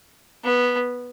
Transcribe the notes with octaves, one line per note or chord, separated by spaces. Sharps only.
B3